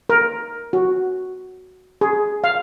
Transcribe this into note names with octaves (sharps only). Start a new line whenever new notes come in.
A#4
F#4
G#4
F5